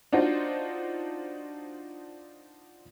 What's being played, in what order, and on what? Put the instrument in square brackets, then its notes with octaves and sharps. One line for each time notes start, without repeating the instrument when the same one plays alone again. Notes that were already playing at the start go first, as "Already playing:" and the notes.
[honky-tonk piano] D4 D#4 F4 F#4 C5